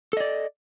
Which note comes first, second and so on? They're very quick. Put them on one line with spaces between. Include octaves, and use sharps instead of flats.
A4 D#5 D5